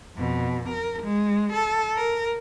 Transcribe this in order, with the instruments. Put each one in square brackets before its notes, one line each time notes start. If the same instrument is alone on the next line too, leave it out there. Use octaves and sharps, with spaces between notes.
[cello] F2 B2
A#4
G#3
A4
A#4